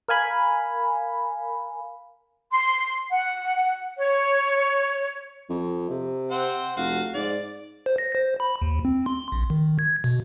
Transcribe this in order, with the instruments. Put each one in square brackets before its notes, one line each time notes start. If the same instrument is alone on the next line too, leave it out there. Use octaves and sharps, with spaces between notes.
[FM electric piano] A#4 F5 G#5 B5
[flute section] C6
F#5
C#5
[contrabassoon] F2
C3
[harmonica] C4 C5 F#5
[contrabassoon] F1 [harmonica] F#4 F5
[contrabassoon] G#2 [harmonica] D5
[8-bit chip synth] C5
A#6
C5
B5
D#2
C4
C6
A#1
D#3
G#6
B2